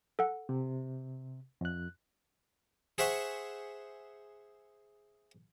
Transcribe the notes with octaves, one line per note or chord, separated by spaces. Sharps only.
A4 F#5
C3
F2 F#6
G#4 C5 E5 F#5 C#6